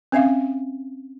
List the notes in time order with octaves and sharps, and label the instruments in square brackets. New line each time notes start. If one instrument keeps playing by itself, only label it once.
[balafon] C4 C#4 E5 F5